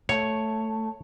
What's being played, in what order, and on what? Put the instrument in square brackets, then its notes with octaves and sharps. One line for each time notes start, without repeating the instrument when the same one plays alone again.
[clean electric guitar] A3 [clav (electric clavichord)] C#5